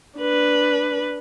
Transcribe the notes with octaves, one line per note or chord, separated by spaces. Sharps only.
D4 B4